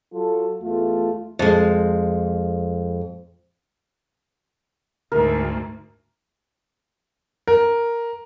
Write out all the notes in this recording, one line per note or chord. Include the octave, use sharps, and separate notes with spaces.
F#3 F4 A4
E2 A3 F4
F2 G#3
D2 G#2 A#4
A#4